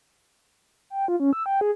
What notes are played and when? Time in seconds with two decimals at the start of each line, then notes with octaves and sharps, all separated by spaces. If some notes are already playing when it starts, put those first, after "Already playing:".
0.90 G5
1.08 F4
1.20 C#4
1.33 E6
1.46 G5
1.61 G#4